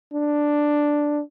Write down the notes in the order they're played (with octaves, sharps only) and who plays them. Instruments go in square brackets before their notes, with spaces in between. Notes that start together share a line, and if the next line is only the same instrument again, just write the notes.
[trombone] D4